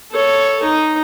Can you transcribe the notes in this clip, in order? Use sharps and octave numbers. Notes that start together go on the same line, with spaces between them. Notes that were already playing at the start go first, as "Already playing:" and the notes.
A4 C#5
D#4